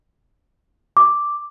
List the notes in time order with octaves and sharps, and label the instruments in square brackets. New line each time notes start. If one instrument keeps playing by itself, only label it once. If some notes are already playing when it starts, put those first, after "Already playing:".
[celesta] D6